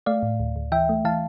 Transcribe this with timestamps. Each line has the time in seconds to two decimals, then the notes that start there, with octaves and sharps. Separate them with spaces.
0.06 A3 D5 F5
0.23 A2
0.40 D2
0.56 D2
0.72 E3 E5 G5
0.89 A3
1.05 E3 F5 A5